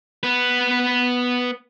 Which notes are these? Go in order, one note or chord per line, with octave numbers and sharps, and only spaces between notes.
B3 B4